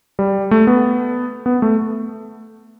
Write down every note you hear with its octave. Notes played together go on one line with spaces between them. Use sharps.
G3
A3
B3
B3
A3